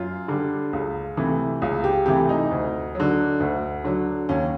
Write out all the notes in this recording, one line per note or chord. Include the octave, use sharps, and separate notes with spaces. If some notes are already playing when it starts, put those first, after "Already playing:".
Already playing: F#2 F4
D3 G3
C#2
C3 E3 A3
C#2
G4
C3 E3 A3 G4
D#4
D2
D3 F#3
D2
D3 F#3
D#2 C#4